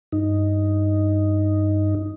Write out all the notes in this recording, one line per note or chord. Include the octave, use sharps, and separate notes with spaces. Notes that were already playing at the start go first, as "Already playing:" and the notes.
G2 D#4